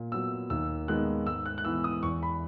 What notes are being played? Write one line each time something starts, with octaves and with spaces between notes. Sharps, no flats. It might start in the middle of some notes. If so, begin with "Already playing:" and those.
Already playing: A#2
F#3 B3 E6
D#2 E6
D#3 G#3 B3 F#6
G#2 E6
F#6
F#6
E3 B3 E6
D#6
E2 C#6
B5